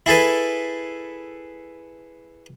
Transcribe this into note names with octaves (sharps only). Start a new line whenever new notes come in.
E4 G#4 A4 B4